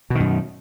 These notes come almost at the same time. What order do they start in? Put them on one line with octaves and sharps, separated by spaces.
B2 D#3 F#2